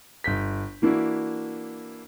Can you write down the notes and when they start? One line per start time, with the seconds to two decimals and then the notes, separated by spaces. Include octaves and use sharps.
0.24 G1 G6 B6
0.82 E3 A#3 D4 E4 F#4